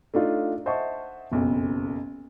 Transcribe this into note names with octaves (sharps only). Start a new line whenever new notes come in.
A3 D4 D#4 F4
C5 D#5 E5 F#5 A5 C#6
F#1 B1 F2